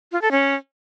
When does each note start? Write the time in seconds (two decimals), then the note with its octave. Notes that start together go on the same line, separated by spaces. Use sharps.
0.12 F4
0.22 A4
0.31 C#4